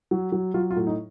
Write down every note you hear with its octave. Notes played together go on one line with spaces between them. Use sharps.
F#3
F#3
F#3 F4
F4
A2
D#4